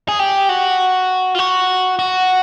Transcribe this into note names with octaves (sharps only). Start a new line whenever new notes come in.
G#4
G4
F#4
F4
F#4
F#4